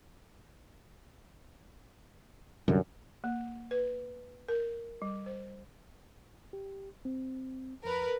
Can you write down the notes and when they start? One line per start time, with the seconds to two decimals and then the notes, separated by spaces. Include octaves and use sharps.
2.68 C2 F#2 D3 G3
3.24 A#3
3.71 B4
4.48 A#4
5.02 G3
5.26 C5
6.53 G4
7.05 C4
7.85 F2 A#4 B4